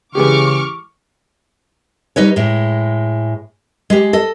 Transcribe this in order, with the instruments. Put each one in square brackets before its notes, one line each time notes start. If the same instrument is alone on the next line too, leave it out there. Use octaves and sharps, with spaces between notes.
[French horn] C#3 [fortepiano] E3 G#3 G4 [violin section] C#6 D6 F6
[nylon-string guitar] G3 D#4 B4 C#5
A2 G#3
G#3 G4
A4 D#5